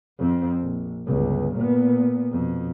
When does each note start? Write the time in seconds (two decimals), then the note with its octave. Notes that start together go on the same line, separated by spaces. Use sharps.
0.19 F2 C4
0.61 A#1
1.07 G1 C#2
1.56 A#2 B3
2.32 F2 B2